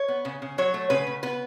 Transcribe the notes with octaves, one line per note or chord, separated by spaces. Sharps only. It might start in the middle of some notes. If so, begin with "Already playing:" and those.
Already playing: C#5
B3
C#3
C#3
F#3 C#5
A3
C#3 B4
C#3
B3 B4